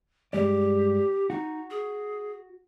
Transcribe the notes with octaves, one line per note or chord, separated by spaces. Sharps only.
G2 G#3 G4 D5
D#4 F#4
G#4